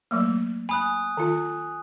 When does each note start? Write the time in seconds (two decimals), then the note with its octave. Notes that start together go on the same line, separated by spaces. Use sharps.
0.11 F#3 A3 A#3
0.69 G#5 B5 D#6 F#6
1.17 D#3 F4